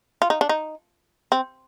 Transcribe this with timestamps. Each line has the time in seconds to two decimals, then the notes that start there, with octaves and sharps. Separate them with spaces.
0.22 F4
0.30 D#4
0.41 D4
0.49 D#4
1.32 C4